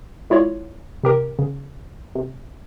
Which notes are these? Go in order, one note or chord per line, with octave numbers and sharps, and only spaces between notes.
G#3 E4 F4 C#5 D5
C3 G4 A#4
C#3
C3